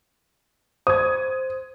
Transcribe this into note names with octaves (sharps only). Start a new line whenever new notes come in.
C5 D#6 G#6